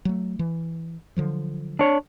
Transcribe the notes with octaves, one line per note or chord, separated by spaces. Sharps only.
F#3 A3
E3
D3 F3 F#3
D4 C#5